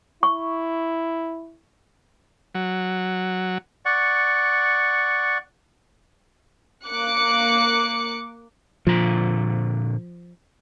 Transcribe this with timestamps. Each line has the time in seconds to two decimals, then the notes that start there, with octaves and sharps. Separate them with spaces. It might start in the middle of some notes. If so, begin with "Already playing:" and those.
0.23 E4 C#6
2.55 F#3
3.85 D5 F#5 C#6
6.85 A#3 D6 F#6 C#7
8.87 A#2 D3 F3 A#5